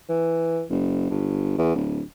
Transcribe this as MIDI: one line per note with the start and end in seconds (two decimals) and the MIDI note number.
0.09 0.63 52
0.70 1.08 30
1.09 1.58 31
1.58 1.73 40
1.75 2.01 26